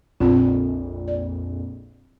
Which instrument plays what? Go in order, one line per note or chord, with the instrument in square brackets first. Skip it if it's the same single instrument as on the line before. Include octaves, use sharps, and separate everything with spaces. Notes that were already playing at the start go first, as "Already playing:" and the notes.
[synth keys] A#1 F2 A#2 [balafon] C4 F4
[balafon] D5